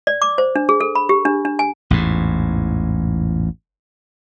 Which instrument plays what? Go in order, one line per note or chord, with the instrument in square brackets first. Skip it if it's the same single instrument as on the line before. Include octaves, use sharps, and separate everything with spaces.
[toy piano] D5
D6
C5
D4
G#4
A4
B5
G4
D4
D4
G#5
[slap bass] A1 E2 G#2